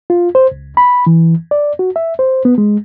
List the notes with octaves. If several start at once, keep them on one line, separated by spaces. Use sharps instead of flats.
F4
C5
C#2
B5
E3
D5
F#4
E5
C5
B3
G#3